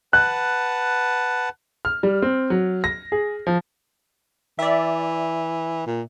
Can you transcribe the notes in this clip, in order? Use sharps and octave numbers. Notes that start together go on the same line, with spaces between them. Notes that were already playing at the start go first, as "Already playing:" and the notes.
B4 F#5 A5 F#6
F6
G3
C4
F#3
A#6
G#4
F3
E3 D5 E5
A#2